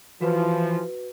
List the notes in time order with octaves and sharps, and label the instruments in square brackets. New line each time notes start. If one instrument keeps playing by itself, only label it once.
[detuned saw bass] E3 [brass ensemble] F3 [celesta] F#4 B4